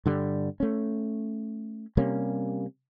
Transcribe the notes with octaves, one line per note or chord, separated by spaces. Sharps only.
G2 D3 G3
A3 C#4
C3 G3 A#3 C#4